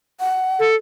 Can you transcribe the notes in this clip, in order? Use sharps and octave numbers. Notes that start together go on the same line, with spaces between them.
F#5
A4